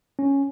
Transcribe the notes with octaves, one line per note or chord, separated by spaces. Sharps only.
C#4